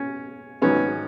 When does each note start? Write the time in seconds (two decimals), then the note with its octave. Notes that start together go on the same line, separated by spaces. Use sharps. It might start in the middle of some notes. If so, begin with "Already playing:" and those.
Already playing: C#4
0.62 G#1 G#2 F#3 B3 C#4